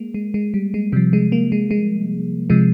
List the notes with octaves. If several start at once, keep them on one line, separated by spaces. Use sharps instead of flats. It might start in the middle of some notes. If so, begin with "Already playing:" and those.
Already playing: G#3 A#3
G#3
G#3
G3
G#3
C3 F3 G3
G#3
A#3
G#3
G#3
C3 F3 G#3